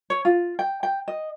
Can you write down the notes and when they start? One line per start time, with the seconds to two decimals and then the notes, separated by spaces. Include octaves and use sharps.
0.10 C#5
0.25 F4
0.59 G5
0.83 G5
1.08 D#5